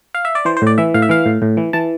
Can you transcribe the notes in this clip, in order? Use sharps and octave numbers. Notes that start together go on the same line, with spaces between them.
F5
E5
D5
E3 C5
C5
A2 D5
E3 E5
A2 F5
E5
E3 F5
A2
A2
E3
E3 A5